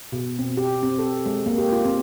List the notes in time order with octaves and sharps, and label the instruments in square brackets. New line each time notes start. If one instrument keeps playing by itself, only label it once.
[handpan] B2
C4
G4
C4
A4
G#3
A#3
G4
F4
C4